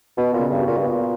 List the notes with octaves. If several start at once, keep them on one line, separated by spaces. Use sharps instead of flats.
B2 B3
A#2
C#3
G2
F#4
A#2
G2
B3
A#2